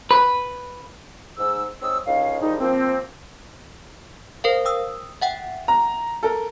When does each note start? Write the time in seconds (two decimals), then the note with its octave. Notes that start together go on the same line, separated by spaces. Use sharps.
0.11 B4
1.38 G#2 E6
1.82 G#2 C4 C#5 D#6 E6
2.07 C#2 D3 C#4 D#4 F5
2.41 D#3 F3 G3 G#3 D#4
2.60 F3 A#3 C4
4.44 A#4 C5 F5
4.65 G5 D#6 E6
5.22 E5 F#5 G5
5.68 A#5
6.23 A4 A#4